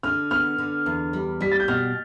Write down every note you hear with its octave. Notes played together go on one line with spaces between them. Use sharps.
D3 F6
B3 F6
D3
E2
G3
G3 B6
A6
G6
B2 F6